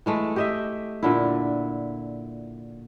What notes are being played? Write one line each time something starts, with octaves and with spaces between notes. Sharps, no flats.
E3 G#3 A3
G4 D#5 E5
A#2 D3 E4